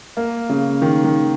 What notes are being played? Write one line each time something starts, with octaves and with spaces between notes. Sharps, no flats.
A#3
C#3
D#3
D#3